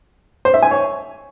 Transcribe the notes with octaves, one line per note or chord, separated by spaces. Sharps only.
C5
E5
G#5
C#5